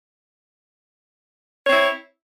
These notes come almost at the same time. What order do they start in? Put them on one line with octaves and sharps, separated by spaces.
C#5 C4 E4